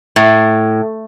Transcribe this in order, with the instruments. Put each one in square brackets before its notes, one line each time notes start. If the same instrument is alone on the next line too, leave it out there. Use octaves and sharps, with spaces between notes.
[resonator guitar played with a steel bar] A2